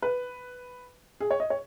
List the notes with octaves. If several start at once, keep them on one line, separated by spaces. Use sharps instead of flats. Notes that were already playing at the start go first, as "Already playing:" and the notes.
B4
G#4
C#5
D#5
C#5